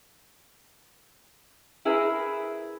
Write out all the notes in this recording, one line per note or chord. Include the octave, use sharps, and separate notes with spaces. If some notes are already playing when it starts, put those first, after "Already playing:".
E4 G#4 A#4 B4 E5